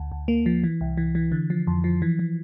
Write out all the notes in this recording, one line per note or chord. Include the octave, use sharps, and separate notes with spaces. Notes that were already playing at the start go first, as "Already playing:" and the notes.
Already playing: D2
D2
A#3
F3
E3
C2
E3
E3
D3
F3
F2
F3
E3
E3